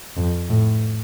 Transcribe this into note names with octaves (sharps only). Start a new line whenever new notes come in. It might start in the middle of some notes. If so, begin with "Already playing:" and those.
F2
A2